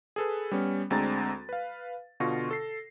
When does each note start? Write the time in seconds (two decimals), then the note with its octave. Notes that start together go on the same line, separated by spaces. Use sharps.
0.16 G#4 A4 B4
0.51 G3 B3 C#4
0.90 D2 G#3 C4 D4 A#5 A6
1.49 B4 F5
2.20 B2 D3 F4 C#6 A#6
2.51 A4 C7